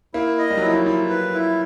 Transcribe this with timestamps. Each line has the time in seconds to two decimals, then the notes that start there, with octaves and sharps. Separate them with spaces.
0.14 A#3 E4
0.39 D#5
0.50 G3
0.57 F#3
0.62 F3 E4
0.74 F#3
0.86 F3 E4
1.09 B4
1.33 E4